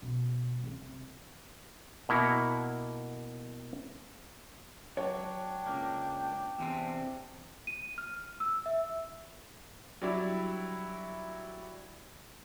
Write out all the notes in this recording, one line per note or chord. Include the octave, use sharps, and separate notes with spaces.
B2
C2 C4
B2 A#3 E4 F#5 A#5
F#3 D4 C#5 G5
C#2 A#3
E2 C3 C4
D#7
F6
E6
E5
F#3 G3 D4 E4